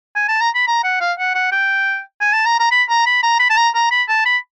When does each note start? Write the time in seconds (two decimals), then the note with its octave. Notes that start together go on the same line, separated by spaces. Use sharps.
0.16 G#5
0.29 A5
0.41 A#5
0.55 B5
0.68 A#5
0.84 F#5
1.01 F5
1.19 F#5
1.35 F#5
1.52 G5
2.21 G#5
2.33 A5
2.46 A#5
2.59 A#5
2.71 B5
2.90 A#5
3.06 B5
3.23 A#5
3.40 B5
3.50 A5
3.57 A#5
3.75 A#5
3.91 B5
4.09 A5
4.25 B5